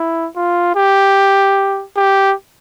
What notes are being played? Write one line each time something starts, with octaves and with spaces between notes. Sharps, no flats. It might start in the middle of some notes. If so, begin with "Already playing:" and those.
Already playing: E4
F4
G4
G4